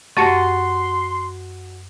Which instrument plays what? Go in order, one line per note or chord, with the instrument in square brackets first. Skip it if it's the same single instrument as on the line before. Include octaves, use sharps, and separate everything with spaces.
[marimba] F#2 [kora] F#4 [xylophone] G4 A5 C#7 [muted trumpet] C6